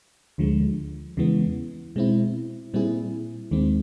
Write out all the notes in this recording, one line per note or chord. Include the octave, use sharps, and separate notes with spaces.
D2 D3 F3 G#3
E2 C#3 E3 G#3 B3
B2 G#3 C4 E4
A#2 G3 C4 E4 G#4
D#2 D#3 G#3 C4